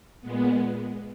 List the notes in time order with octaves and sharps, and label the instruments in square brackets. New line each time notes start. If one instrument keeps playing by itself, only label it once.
[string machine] A#2 G#3 B3